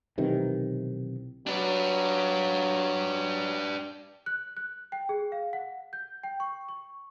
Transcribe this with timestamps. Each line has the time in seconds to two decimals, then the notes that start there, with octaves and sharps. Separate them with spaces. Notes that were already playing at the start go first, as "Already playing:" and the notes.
0.18 B1 C3 D#3 E3
1.47 F#3 D4 B4
4.26 F#6
4.57 F#6
4.92 G5
5.09 G#4
5.32 F5
5.53 F#5
5.93 G6
6.24 G5
6.40 C#6
6.69 C#6